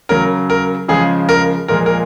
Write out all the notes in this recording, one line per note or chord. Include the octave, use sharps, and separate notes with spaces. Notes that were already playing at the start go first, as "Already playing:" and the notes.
C#3 F#3 A#4
A#4
C#3 F3 G#3 G#4
A#4
A#2 F3 G#3 A#4
A#4